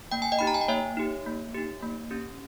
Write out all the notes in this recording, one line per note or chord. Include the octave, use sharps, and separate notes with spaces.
A#3 G5
G#5
D#5 G5
D#4 G4 B5
A#5
G#5
G5
A#3 C#5 E5
D#4 G4
A#3
D#4 G4
A#3
C#4 G4